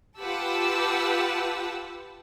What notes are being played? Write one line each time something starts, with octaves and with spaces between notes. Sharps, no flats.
F4 G4 B4 F#5 A5 E6